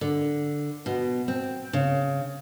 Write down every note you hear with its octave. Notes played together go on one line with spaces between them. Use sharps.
D3
B2
C4
C#3